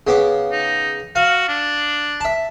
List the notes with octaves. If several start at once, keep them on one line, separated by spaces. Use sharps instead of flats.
C#3 B3 D6
D#4
F#4 F5
D4
E5 A5